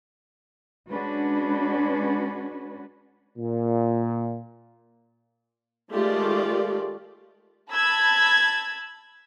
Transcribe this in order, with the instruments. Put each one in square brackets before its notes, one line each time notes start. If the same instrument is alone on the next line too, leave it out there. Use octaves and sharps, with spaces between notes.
[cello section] G#3 C#4 D4 F#4 B4
[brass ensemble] A#2
[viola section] D#3 G#3 A3 F4 G4 D5
[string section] A5 B5 E6 G#6